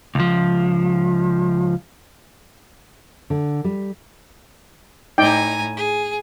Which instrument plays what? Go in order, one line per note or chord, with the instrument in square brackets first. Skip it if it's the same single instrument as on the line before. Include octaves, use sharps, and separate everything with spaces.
[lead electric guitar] C#2 F3
[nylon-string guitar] D3
G3
[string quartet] A2 G#5 A#5 [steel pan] D#4 D5 G5
[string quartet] G#4